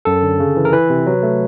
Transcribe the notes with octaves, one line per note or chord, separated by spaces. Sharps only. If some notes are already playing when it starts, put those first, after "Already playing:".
F#2 A4
D3
C#3
E3
A#4
E3 B4
C3
F#3
A3